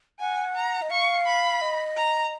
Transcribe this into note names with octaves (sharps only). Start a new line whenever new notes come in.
F#5 G#5
A#5
D#5
F5 C#6
B5
D#5
A#5